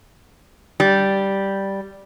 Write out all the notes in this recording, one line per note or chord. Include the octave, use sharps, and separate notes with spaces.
G3